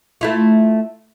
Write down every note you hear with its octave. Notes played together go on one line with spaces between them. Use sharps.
A3 E4 F4